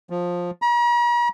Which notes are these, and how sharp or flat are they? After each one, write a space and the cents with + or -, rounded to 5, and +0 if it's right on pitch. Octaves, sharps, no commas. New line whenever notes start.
F3 +15
A#5 +45